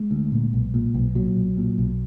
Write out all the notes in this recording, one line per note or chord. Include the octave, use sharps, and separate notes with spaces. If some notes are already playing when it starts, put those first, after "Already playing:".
Already playing: G#3
D2
A#2
B1
A#2
B1
A#2 F#3
B1
A#2
B1